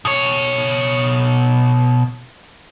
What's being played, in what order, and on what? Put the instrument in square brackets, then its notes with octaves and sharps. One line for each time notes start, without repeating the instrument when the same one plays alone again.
[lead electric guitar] B2 C#5